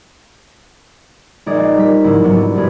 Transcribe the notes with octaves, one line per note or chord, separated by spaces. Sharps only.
A#1 G#3 D#4 G#4 D5 D#5
G3 A#4 B6
G#2 C#3 F3 A#3 C#4 E4
G#2 C3 F#3 B3 D4
A#1 G2 B2 F4 G#4 B4